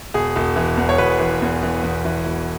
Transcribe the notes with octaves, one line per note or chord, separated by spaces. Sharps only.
E1 G#4
E1
E3
E2
C#5
E1 B4
E3
E2
E3
E2
E3
E1